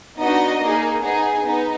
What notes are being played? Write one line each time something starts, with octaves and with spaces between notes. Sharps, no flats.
B3 D4 D#4 F#4 D#5
A#3 D#4 G#4
B3 D#4 G#4
B3 D#4